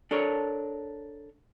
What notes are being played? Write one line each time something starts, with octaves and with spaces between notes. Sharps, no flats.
D4 A4 A#4 C#5